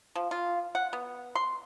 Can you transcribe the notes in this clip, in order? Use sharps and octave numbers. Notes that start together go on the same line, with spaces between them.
F3
F4
F#5
B3
C6